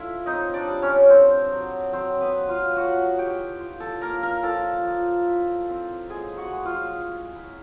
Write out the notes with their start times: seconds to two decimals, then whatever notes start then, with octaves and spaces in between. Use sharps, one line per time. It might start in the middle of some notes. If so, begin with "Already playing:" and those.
Already playing: D4 E4 F4 A4 E5
0.26 C4 D#4 D#5
0.54 D4 D5
0.68 G3
0.82 C#4 C#5
1.09 C4 D4 C5
1.52 F#3
1.93 F#3 C4 C5
2.21 B3 B4
2.34 A#3
2.49 F4 F5
2.76 A3 F#4 F#5
3.18 E4 G4 G5
3.60 F4
3.80 A4 A5
4.01 A#3 A#4 A#5
4.23 A#4 A#5
4.43 F3 A4 A5
4.85 F3
5.27 E4
5.69 C4
6.09 G#3 G#4 G#5
6.37 F#4 F#5
6.52 G#3
6.65 F4 F5
6.94 E4
7.36 E4